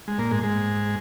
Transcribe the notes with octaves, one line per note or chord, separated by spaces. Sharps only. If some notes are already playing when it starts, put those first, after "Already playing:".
G#3
A#2 A#3
G#2 G#3
G#2 G#3